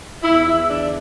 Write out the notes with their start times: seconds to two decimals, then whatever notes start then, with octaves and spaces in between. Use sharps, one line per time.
0.23 E2 E4
0.46 E4
0.53 E2
0.69 D4
0.84 D3